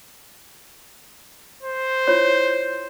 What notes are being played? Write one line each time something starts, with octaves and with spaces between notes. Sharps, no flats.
C5
E4 F4 C#5